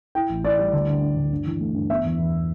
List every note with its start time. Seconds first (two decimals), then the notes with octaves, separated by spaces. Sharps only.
0.15 E4 G5
0.29 A1
0.44 E4 D5
0.59 G3
0.73 D2
0.88 D3
1.02 D4
1.16 D2
1.32 G2
1.46 E3
1.60 A3
1.75 G2
1.89 B3 E5
2.04 E2
2.19 E2